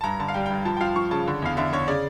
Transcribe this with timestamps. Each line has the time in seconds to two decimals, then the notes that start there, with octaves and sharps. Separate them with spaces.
0.01 A5
0.04 G2 A#5
0.19 D3 A5
0.28 F5
0.34 G3 G5
0.46 G5
0.50 G2
0.65 F3 A5
0.77 G5
0.81 F3 F5
0.96 F3 C#6
1.11 C#3 A5
1.27 D3
1.42 E2 F5
1.57 D3 E5
1.73 D3 C#5
1.88 C#3 D5